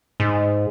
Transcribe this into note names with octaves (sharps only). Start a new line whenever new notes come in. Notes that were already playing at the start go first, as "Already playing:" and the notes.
G#2